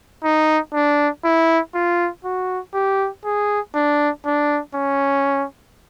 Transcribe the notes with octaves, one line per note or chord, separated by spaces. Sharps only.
D#4
D4
E4
F4
F#4
G4
G#4
D4
D4
C#4